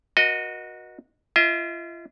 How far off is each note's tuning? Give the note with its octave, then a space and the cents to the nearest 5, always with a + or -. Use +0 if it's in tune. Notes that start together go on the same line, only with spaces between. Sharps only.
F#4 -15 A#4 +40 D#5 +0
F4 -35 D#5 +45